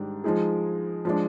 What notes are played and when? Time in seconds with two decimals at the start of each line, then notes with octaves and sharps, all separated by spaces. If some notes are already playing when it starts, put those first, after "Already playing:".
Already playing: G#2 D#3 G3 D4
0.24 F3 G#3 D#4 G#4
1.05 F3 G#3 D4